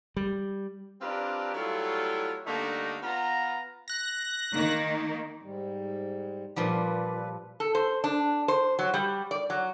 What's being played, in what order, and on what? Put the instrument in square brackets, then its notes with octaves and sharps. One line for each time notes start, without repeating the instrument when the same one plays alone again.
[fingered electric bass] G3
[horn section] C4 D4 F4 G4 A#4 B4
F#3 G3 A3 E4 F4
D3 G3 A3 A#3 D4 D#4
B3 F4 A#5
[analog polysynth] F#6 A#6
[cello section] D#3 A#3 [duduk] D#4
[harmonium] G#2 G3
[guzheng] A#2 F3 G3 [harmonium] B4
[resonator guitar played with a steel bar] A4
C5
D4
C5
F#3
G3
D5
F#3